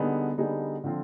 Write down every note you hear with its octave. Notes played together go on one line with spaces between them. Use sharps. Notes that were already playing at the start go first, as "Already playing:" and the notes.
Already playing: D3 G3 B3 D#4 G#4
D3 G3 B3 D#4 G#4
D3 F3 C4 F4